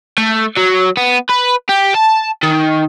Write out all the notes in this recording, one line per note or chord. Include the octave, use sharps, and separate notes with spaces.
A3
F#3
B3
B4
G4
A5
D#3